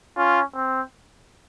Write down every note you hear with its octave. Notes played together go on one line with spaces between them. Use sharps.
C#4 F4
C4